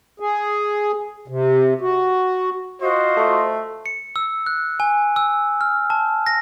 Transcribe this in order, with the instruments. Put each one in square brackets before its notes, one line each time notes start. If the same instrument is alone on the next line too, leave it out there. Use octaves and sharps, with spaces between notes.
[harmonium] G#4
C3
F#4
[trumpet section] F4 C5 D#5 [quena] F#4
[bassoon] A3
[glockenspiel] C#7
E6
F#6
G#5
E6
F6
A5
A#6